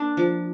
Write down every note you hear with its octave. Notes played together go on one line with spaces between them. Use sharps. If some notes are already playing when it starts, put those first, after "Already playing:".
Already playing: A#3 D4
F3